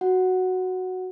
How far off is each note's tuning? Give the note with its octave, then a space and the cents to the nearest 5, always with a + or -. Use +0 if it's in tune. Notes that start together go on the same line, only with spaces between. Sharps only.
F#4 +0 F#5 +0